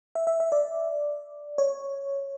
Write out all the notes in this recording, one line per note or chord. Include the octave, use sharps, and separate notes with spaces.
E5
E5
E5
D5
C#5